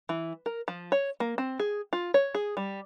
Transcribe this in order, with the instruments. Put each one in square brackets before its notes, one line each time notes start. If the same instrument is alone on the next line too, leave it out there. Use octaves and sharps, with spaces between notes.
[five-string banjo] E3
A#4
F3
C#5
A#3
C4
G#4
F4
C#5
G#4
G3